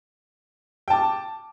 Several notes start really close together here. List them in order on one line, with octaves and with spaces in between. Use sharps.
G5 A5 D6